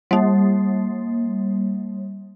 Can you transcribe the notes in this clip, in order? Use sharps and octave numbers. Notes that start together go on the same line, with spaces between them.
G3 A#3